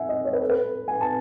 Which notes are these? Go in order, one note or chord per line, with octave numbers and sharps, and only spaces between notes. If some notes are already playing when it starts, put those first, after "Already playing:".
Already playing: E5 F#5 G#5
D#5
C#5
B4
A4
B4
G#5
A5